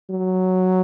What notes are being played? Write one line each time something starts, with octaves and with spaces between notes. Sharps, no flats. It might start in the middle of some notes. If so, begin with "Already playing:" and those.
F#3